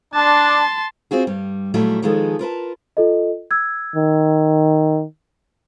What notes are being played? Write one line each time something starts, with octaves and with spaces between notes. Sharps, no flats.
D4 A5 C6
C4 F4 F#4 G#4
G2 G3
A#2 F#3 G3 A3 E4
D#3 F3 G#3 B3 G#4 A4
F4 A#4 B4 A5
F4 A4 D#5
E6 G#6
D#3